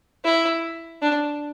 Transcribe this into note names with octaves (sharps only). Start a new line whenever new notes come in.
E4
D4